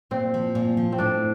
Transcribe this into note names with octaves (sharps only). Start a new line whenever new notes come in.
A#2 C4
F3
A#2
F3
C4
A2 D4